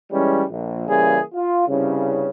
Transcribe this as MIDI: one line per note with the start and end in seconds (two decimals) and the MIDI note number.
0.11 0.44 52
0.11 0.44 55
0.11 0.44 56
0.11 0.44 61
0.49 0.86 34
0.87 1.19 49
0.87 1.19 52
0.87 1.19 55
0.87 1.19 58
0.87 1.19 68
1.34 1.66 65
1.68 2.30 36
1.68 2.30 43
1.68 2.30 49